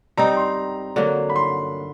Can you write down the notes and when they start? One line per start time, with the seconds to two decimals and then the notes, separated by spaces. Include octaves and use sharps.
0.18 G3 C4 D#4 A#5
0.37 C6
0.96 D3 F#3 A#3
1.30 B5
1.36 C6